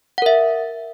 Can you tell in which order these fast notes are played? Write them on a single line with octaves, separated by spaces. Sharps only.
F#5 A#4 E5